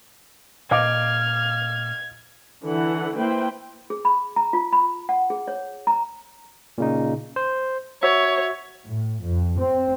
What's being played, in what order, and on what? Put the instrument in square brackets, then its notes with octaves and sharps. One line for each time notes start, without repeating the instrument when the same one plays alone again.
[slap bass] A#2 [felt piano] D#5 F5 D6 [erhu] F6 [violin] G#6
[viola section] D3 E3 F#5
A#3 E4 B4 C5 G5
[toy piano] G#4
B5
A#5
F4
B5
F#5
G#4
C#5
A#5
[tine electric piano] A#2 C#3 D#4
C5
[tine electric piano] F#4 E5 [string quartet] C#5
[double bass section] A2
F2
C4